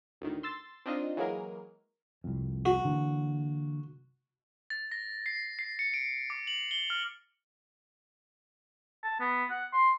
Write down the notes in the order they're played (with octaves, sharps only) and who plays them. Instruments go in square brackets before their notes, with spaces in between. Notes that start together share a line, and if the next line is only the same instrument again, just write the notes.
[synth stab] D2 A2 D#3
C6 E6 A6
C4 D4 D#4 F4 D#5
E3 F#3 G#3 A#3 G#4 A#4
[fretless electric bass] C2 F2
[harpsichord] F#4
[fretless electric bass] D3 E3 A#3
[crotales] A6
A#6
C7
C7
C#7
D7
D6
F#7
G7
F6
[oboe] A5
B3
F#5
C6